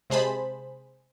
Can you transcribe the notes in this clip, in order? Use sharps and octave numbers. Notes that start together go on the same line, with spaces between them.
C3 G#3 G#4 C5 A5 B5